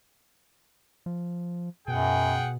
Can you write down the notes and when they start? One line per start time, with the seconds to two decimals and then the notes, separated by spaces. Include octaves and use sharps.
1.06 F3
1.88 F#2 B2 G#4 F#5 G5